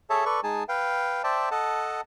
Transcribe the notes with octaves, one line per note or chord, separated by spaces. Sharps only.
G#4 A4 C#5 E5 A5
A4 B4 D5 C#6
G#3 D#4 G#4 G#5 A5
B4 F5 G5
C5 D5 E5 G5 A5
A4 D#5 F#5 A5